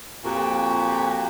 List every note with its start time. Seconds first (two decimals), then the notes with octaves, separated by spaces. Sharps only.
0.24 F2 A#2 F#4 G4